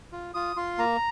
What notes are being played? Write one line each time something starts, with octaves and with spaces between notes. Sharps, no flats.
F4
F4 D#6
F4 C6
A#3 A#5